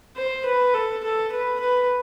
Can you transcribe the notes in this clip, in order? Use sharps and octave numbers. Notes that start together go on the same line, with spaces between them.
C5
B4
A4
A4
B4
B4